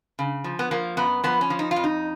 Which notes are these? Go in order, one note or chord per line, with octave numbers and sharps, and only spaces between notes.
C#3
F3
B3
F3 A#3
F#2 B3
F3 B3
C#4
F3
D#4
F4
F2
D#4